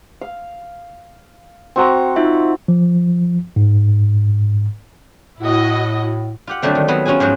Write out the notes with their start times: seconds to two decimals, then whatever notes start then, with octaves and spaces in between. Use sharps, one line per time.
0.21 F5
1.76 C4 F#4 G5 A#5
2.16 D#4 F4 E5
2.68 F3
3.56 G#2
5.39 A2 E4 F#4 D#5
6.47 F4 G4 F#5
6.62 D3 F#3 G3 A3 C4
6.75 D#3
6.88 F#3 B3 C4
7.05 C#4 F4 F#4 G#4 G#5
7.20 G#2 F3 F#3 F#4